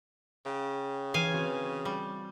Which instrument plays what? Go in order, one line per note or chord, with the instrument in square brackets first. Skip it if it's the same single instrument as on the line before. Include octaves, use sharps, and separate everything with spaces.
[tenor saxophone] C#3 [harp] G5
[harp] E3 [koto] F5 G#5
[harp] C4 F#4
[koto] G3